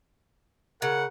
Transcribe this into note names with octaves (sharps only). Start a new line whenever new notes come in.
C#3 A#4 F#5